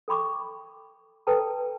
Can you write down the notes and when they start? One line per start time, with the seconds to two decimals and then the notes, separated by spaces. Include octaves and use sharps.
0.08 A4 G5 B5 C#6 D6
1.27 A4 B4 G5 A5 A#5